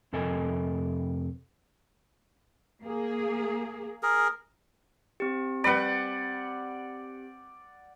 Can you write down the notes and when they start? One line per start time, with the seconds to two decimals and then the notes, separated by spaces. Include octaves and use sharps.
0.13 F2 C3 A4 A#4 D#5 G#5
2.82 A#3 G#4
4.03 G#4 A#4
5.20 C4 G4
5.64 G3 B4 D5 F#5 B5